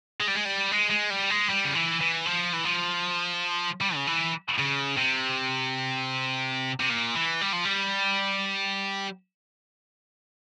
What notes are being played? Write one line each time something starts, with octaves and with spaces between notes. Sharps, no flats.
G#3
G3
G#3
G3
G#3
G#3
G3
G#3
G3
C#3
E3
E3
F3
E3
F3
G3
C#3
E3
C#3
C3
C3
A#2
E3
G3
F3
G3